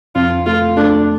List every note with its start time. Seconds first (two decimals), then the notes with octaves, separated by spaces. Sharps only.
0.15 F2 F4
0.46 A3 F4
0.77 A3 D4